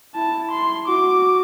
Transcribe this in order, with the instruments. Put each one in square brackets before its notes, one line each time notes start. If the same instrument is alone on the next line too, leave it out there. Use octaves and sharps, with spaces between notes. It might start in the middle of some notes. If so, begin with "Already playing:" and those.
[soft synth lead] E4 [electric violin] A5
[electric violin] C6
[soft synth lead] F#4 [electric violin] D6